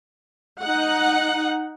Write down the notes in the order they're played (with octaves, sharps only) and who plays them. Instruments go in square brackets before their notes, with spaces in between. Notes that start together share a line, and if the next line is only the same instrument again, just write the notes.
[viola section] D#4 F#5